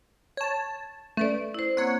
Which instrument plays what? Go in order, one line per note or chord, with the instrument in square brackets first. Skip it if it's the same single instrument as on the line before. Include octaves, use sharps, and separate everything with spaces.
[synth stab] C#5 A5
[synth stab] A3 [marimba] C#4 B4 D5
[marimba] E4 C5
[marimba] A#3 C4 [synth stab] C#5 F#5